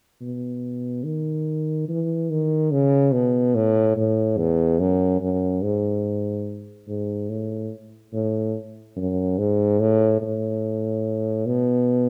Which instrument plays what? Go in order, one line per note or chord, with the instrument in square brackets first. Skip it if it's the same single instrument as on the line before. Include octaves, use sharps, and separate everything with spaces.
[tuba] B2
D#3
E3
D#3
C#3
B2
A2
A2
E2
F#2
F#2
G#2
G#2
A2
A2
F#2
G#2
A2
A2
B2